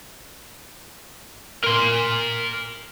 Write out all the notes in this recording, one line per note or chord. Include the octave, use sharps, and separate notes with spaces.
A#4 C6